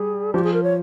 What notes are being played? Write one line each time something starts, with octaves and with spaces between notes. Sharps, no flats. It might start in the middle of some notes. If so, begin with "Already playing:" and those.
Already playing: G3 G#4
F3 G4
G#4
A#4
C#5